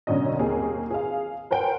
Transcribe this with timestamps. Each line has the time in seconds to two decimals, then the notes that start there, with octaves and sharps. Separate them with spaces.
0.07 F#2 B2 D3 C#4 D#5
0.39 D#2 A#3 C4 G#4
0.90 G#4 F5
1.51 A#4 C5 F#5 G5